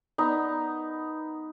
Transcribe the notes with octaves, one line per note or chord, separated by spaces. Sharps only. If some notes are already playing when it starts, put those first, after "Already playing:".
B3 D#4